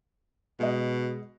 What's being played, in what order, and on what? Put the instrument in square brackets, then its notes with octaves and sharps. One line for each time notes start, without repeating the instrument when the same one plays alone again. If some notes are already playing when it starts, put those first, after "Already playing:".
[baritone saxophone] B2 [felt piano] G#3 D#5